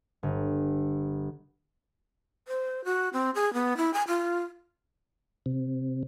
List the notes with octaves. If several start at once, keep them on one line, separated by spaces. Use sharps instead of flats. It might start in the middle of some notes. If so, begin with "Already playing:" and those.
G1
C5
F#4
C4
G#4
B3
E4
G#5
F4
C3